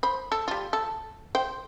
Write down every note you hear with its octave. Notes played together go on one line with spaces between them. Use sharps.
C5 B5
A4
G3 F4
A4
C5 G5